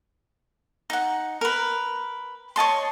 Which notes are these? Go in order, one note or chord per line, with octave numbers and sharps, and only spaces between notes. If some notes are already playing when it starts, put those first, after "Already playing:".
D#4 F#5
A#4 B4
C#5 D#5 A5 C6